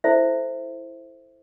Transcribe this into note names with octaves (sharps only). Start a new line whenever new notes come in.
E4 A4 C5 E5